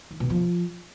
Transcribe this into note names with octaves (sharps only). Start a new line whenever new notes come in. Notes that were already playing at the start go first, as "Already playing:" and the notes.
D#3
B2
F3